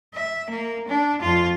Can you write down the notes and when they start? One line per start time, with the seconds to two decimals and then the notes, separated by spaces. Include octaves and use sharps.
0.15 E5
0.50 A#3
0.88 D4
1.22 F2 F4